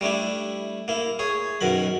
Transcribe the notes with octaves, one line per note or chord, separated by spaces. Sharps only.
G3 A3 D4 E4
A#3 E4
G#4 C#5
F#2 B2 D#3 B5